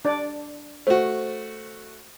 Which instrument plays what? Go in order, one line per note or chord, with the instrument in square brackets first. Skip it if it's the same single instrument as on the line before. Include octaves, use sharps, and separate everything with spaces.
[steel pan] D4 D5
[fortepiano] A3 F#4 [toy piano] C5